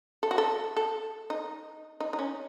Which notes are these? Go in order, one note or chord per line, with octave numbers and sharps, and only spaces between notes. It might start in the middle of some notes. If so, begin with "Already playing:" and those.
A4
F#4
A4
A4
D#4
D#4
D#4
C#4